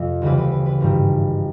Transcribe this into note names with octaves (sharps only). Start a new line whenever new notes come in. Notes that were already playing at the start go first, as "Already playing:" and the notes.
Already playing: F2 C3 F3
D2 C#3 E3 G3 B4
B4
B4
B4
G#1 G2 D#3 G3